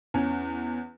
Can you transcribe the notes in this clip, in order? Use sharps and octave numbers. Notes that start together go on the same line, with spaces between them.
E2 C#4